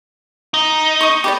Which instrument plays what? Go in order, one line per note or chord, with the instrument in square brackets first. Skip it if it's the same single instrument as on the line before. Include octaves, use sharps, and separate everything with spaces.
[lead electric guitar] D#4
[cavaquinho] C#6 D#6
G4 B4 D5